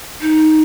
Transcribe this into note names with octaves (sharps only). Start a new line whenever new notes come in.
D#4